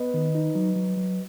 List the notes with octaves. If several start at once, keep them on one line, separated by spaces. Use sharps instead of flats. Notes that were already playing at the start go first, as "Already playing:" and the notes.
Already playing: B3 B4 D#5
D#3
D#4
F#3
F#3
F#3